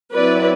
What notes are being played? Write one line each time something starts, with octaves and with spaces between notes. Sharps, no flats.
F#3 C4 E4 B4 D5